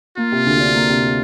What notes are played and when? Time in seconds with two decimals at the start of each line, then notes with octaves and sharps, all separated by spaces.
0.17 A#3 F4
0.32 C3
0.46 D2
0.60 D4
0.75 A#3
0.89 C3